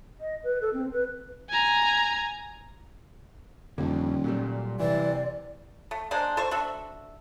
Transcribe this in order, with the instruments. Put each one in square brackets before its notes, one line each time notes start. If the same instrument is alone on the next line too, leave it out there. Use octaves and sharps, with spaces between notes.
[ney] D#5
B4
A4
C4
B4
[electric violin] G#5 A#5
[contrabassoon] D#1 [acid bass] F2 [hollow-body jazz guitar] D3 D#3
[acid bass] A#2 [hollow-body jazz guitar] F#3 G3 A3
[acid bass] C3 [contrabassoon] E3 [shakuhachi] D5
[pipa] A3
G#3 A#3 D4 C5
A4 C5 C#6
D4 F#4 A4 E5